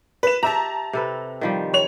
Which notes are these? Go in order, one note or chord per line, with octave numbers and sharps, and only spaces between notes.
B4 E7
G4 E5 A5 A#5
C3 A4 B4
D#3 F3 G3
C#5 F7